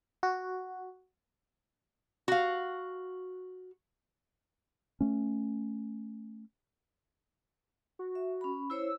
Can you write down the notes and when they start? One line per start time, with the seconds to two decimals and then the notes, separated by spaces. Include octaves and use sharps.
0.23 F#4
2.28 F#4 F5
5.01 A3 C#4
7.99 F#4
8.15 E5
8.41 C#4 B5
8.70 E4 C5 C#5 E6